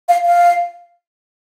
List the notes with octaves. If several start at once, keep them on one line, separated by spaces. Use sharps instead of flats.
F5
F5